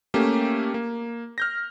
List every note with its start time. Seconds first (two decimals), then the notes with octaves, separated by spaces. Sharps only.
0.14 A3 A#3 C#4 G4
0.74 A#3
1.38 F6 G6 A#6